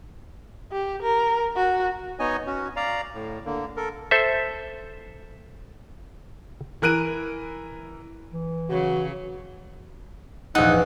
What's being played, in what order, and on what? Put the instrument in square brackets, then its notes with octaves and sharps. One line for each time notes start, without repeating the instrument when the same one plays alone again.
[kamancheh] G4
A#4
F#4
[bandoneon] B3 D#4 C#5 D#5 G#5
C#4 F#4
D5 F5 A#5
A2
D3 A#3
A4 A#4
[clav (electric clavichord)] A4 C5 E5
[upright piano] E3 A#4 F#6 D7 D#7
[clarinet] E3
[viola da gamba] C#3 F#3 [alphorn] F#4
[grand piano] A#1 F#6 [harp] E2 G#2 E3 [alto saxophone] D#4 [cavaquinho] F#5